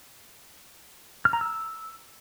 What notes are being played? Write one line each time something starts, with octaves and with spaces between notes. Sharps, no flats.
F6
A#5
E6